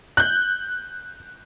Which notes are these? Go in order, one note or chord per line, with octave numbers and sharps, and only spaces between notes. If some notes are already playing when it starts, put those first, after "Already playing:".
F#6 G6